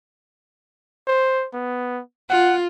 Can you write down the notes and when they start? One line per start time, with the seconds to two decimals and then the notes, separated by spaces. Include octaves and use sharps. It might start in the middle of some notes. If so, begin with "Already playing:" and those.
1.08 C5
1.54 B3
2.30 F4 F#5